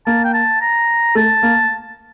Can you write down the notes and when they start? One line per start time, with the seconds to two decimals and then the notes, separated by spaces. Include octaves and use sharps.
0.06 A#3 A5
0.24 G5
0.34 A5
0.61 A#5
1.15 A3 A5
1.43 A#3